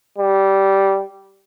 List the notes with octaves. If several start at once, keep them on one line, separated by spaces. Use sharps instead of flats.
G3